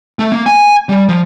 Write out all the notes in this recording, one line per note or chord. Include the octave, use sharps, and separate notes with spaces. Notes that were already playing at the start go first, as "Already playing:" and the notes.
A3
A#3
G#5
G3
F3